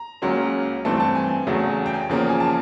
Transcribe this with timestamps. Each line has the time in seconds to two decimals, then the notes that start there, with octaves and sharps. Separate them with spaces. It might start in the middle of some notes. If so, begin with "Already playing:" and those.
Already playing: A#5
0.22 C#2 C#3 F#3 A#3 C#4
0.85 G2 E3 A3 C4 A5
1.00 A5
1.15 G#5
1.47 E2 C#3 F#3 A3
1.86 G5
1.93 G#5
2.09 E2 C#3 F3 A#3 C#4
2.29 G#5
2.40 A5